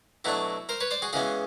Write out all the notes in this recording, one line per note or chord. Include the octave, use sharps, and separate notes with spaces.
B2 F#3 A3 D4 E4 F#4
A#4 C5
B4 C#5
C5 D5
F#4 G#4
C#3 E3 G#3 B3 F#4 G#4